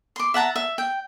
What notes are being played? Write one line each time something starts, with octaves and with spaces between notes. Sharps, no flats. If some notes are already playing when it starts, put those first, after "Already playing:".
C6 D6
E5 F#5 A5 A#5
E5
G5